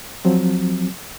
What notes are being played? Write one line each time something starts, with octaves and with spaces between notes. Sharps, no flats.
F3 F#3 C4